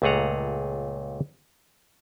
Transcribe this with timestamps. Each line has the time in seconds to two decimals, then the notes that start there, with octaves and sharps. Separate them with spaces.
0.02 C#2 A#2 A3 G#4 F#5 A#5